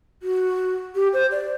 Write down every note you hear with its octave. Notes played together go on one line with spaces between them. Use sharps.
F#4
G4
C5
D5